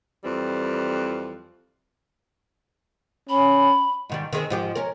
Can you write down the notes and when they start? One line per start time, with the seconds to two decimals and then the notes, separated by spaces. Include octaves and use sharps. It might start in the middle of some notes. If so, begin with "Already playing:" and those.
0.25 F2 E3 G3 C4
3.30 C#4 B5
4.10 G#2 D#3 G3
4.33 D#3 G#3 C4
4.50 G#2 F3 G4
4.75 C#4 A#4